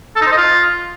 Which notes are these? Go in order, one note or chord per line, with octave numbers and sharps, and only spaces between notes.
A4
D#4
C5
D#5
F4